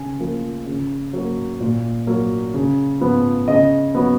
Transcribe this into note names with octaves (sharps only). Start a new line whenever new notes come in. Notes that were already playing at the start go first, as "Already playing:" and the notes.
Already playing: C#3 G#5
F3 A#3
C#3
F#3 A#3
A#2
F#3 A#3
C#3
F3 B3
C#3 D#5
F#3 B3